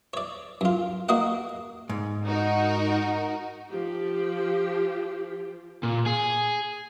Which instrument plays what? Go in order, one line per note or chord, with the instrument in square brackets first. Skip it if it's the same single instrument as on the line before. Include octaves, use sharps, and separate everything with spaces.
[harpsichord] C#5 D5
F#2 F4
A#3 F#4 D#5 F#5
[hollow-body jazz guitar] G#2
[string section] D#4 F#4 A#4
[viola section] F3 G4
[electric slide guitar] A#2
G#4